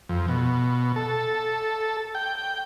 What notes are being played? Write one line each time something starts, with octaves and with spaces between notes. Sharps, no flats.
F2
B2
A4
G5